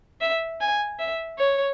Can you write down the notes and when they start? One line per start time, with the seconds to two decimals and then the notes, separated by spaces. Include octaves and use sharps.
0.21 E5
0.60 G#5
0.99 E5
1.38 C#5